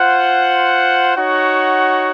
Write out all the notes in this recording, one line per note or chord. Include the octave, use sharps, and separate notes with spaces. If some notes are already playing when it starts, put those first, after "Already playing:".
Already playing: F4 C5 F#5
D#4 F#4 C#5 F#5